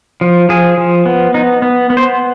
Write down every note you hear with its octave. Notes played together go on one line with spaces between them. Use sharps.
F3
F3 G#4
F3
B3
B3 D#4
B3
B3
C5